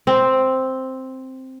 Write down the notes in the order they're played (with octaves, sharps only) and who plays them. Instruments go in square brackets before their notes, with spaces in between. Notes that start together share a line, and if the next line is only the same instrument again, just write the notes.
[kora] C4